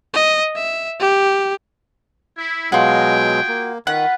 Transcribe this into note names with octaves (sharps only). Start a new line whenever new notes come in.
D#5
E5
G4
E4
B2 F#3 G#3 F4 F#4 G#4 G5
A#3
D#3 F4 B4 F#5